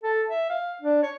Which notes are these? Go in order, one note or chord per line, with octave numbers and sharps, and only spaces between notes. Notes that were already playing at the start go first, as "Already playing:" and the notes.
A4
E5
F5
D4
C#5